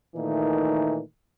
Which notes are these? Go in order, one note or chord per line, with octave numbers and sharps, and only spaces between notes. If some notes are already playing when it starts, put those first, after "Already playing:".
A#2 D#3 E3 A3 D#4